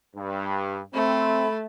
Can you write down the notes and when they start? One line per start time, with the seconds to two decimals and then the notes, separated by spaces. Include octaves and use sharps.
0.16 G2
0.94 A3 C4 B5